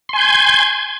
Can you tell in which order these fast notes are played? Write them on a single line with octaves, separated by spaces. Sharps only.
C6 G#5 G6 G#6